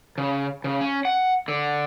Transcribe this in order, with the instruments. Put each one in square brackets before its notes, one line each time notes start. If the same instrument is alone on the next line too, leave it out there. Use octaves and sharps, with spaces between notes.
[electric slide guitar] C#3
C#3
C#4
F#5
D3